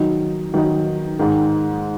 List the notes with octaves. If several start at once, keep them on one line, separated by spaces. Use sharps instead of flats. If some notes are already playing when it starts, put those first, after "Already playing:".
Already playing: D#3 F#3 D#4
D#3 F#3 D#4
G#2 D#3 G#3